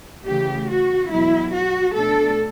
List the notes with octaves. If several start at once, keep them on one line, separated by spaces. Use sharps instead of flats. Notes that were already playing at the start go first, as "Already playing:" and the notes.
C#3 E3 A3 G4
F#4
E2 B2 F#3 E4
F#4
B2 A3 D4 A4